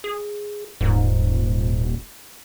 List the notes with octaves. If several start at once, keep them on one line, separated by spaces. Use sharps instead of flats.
G#4
D#1 G#2